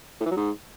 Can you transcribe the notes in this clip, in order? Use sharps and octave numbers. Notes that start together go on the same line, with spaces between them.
A2
E3
F#3
G#2